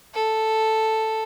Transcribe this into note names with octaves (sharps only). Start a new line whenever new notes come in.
A4